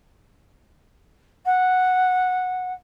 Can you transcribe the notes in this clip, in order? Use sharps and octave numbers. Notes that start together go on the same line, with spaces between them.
F#5